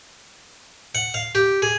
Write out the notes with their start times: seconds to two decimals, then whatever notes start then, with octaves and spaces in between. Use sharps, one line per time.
0.95 F#5
1.14 F5
1.35 G4
1.62 G#4